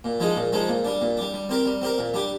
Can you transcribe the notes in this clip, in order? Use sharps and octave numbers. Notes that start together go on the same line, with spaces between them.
A#2
F3 G#3 D#4 G#4
A#2
F3 G#3 D#4 G#4
A#2
G3 D4
A#2
G3 D4
G3
C4 G4 A#4
G3
C4 G4 A#4
A#2
G3 D4 G4